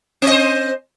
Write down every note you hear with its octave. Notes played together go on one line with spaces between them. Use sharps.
C4 C5 D#5